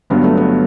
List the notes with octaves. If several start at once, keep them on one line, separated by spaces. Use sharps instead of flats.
G1 G2 F#3 B3
A3
B3